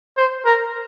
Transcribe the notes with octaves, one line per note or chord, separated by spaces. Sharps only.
C5
A#4